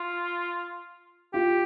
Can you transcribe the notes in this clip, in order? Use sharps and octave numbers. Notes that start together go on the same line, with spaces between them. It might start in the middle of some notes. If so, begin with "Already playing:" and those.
Already playing: F4
F4 G4